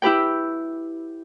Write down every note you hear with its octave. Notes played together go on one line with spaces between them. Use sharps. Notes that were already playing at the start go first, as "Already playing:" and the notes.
E4 G4 B4 G5